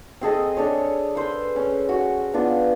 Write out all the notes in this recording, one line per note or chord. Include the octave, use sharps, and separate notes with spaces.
C4 G#4 A4 D#5
D4 G#4 A4 C#5
B4 C5 B5
C#4
F#4
B3 D4 F4